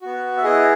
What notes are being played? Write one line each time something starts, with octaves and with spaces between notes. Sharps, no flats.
B3 F#4
E5
B3 E4 G#4 D#5